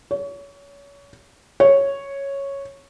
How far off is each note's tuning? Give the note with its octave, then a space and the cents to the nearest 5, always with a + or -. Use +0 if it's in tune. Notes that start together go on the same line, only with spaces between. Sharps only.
C#5 +30
C#5 -5